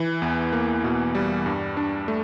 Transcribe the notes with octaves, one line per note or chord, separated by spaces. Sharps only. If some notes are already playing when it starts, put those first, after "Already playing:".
Already playing: E3
E2
A#3
B2
G3
G2
D4
A3